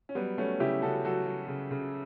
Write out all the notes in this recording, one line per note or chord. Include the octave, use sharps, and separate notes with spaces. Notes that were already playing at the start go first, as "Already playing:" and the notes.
C#4
F#3 G3 B3
F#3 A3 C#4
C#3 E4 G4
C#3 F#4 A4
F#3 F#4 A4
F#3
C#3
C#3